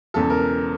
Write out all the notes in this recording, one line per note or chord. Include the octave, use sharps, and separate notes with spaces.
E1 E2 C#3 A4
A#4